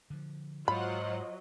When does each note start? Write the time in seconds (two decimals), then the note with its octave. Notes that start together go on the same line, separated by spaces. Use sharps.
0.10 D3 F3
0.68 G#2 F#3 F4 C5 D#5 F#5 B5